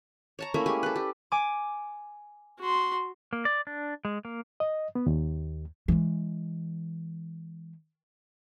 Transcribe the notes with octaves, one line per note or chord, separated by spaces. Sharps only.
C#5 A5 A#5
A3 A#3 C#4 E4
G#3 G4 G#5
A4 B4
G4
G#5 D6
F#4 C6
A#3
D5
D4
G#3
A#3
D#5
B3
D#2
E3 G#3